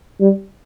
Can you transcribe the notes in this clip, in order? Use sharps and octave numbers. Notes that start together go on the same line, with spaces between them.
G3